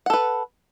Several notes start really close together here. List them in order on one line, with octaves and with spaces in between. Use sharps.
F#5 A4 B4